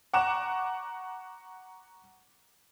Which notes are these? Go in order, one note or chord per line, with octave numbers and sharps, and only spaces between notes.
F#5 A#5 C#6 D6 F#6 E7